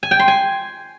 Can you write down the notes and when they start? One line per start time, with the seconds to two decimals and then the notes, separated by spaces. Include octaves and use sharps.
0.03 G#5
0.11 G5
0.20 C6
0.28 G#5